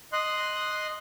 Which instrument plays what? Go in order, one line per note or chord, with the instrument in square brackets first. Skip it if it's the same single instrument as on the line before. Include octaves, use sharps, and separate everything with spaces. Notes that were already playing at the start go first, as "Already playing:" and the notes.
[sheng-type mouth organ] D#5 C6 F#6